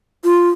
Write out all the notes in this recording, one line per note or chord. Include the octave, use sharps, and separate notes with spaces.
F4